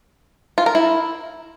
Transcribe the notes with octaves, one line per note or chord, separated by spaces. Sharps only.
F4
A#4
E4